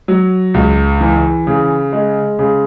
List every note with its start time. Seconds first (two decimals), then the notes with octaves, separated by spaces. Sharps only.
0.08 F#3
0.54 C#2
1.01 E3
1.47 C#3
1.93 G#3
2.39 C#3